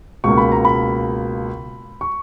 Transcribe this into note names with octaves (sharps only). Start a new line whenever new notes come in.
C#2 B2 A#3 C#6
B5
A#5
B5
C#6